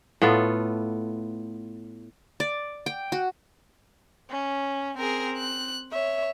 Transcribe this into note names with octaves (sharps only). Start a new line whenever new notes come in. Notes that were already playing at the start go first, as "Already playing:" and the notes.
A2 B3 F4 A4
D5
G5
F#4
C#4
C4 G#4 A#4
F#6
C#5 E5